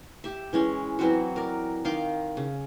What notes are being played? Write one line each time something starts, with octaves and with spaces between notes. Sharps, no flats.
G4 E5
E3 G#3 C#4
E3 F#3 C4 F#4
A#4 D5
D#3 F5 C6 D6
C#3